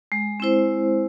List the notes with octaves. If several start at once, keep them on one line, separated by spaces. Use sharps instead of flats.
G#3
C4 E4 C5